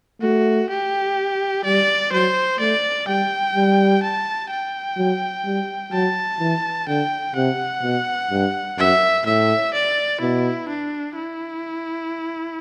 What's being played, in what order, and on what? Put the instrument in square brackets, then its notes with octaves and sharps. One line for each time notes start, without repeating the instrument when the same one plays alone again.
[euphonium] A3 [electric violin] F#4
[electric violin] G4
[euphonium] G3 [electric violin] D5
[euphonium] F#3 [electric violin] C5
[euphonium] A3 [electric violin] D5
[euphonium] G3 [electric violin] G5
[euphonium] G3
[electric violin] A5
G5
[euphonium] F#3
G3
[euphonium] F#3 [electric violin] A5
[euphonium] E3
[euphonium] D3 [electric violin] G5
[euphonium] C3 [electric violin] F#5
[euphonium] B2
G2
[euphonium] F#2 [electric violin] E5
[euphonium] A2 [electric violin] E5
[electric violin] D5
[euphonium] B2 [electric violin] E4
[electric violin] D4
E4